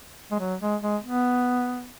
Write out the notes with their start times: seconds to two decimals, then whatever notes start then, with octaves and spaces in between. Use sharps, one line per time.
0.31 G#3
0.40 F#3
0.61 G#3
0.82 G#3
1.03 B3